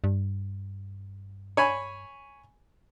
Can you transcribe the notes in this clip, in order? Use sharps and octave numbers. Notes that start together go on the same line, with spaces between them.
G2
C#5 G#5 B5